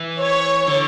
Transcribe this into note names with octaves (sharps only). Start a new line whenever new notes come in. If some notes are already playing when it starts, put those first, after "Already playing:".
Already playing: E3
C#5
D3